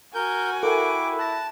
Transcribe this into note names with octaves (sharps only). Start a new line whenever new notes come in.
F#4 A#4 G#5 G6
E4 A4 A#4 G5 D6
A5 F#6 A#6